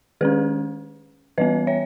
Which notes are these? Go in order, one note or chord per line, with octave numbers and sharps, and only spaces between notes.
D#3 G#3 C#4 G#4 B4
E3 G3 B3 B4 D#5
C#5 E5